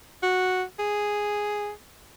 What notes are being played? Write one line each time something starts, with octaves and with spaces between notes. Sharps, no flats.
F#4
G#4